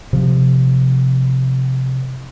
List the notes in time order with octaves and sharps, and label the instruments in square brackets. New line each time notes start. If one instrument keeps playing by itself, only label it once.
[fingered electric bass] C3 F3